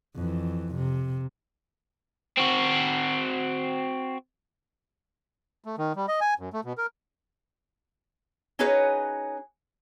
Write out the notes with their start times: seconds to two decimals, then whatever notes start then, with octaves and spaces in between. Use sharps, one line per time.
0.15 F2 E3
0.75 C3
2.38 C4 F#4
5.64 A3
5.78 D#3
5.96 G3
6.08 D#5
6.21 G#5
6.39 F#2
6.53 A3
6.65 B2
6.78 A#4
8.59 C#4 D#4 F#4 G#4 B4 C#5